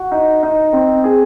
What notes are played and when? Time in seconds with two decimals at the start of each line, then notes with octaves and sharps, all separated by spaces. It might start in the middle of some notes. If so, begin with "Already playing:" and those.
Already playing: F#4
0.11 D#4
0.43 D#4
0.73 C4
1.04 G#4